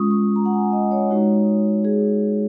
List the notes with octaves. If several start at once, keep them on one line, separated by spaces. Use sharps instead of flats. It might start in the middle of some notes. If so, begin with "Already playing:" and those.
Already playing: G#3 C#4 F4 C#6 D#6
C#6
A#5
F#5
G#5
D#5
C#5
G#3 D#4 F#4
G#4